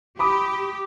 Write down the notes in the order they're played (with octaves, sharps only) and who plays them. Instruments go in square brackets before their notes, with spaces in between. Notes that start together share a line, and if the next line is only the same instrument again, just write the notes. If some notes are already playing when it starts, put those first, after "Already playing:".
[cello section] G4 [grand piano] B5 D6 D#6